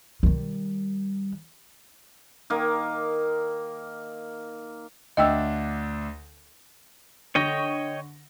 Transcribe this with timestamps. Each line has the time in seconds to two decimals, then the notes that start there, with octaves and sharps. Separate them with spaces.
0.23 D#3 G3
2.50 D#3 A#3
5.17 D2 D4 D#5 E5 G5 E6
7.35 D3 C#5 D#5 G5 C#6 A#6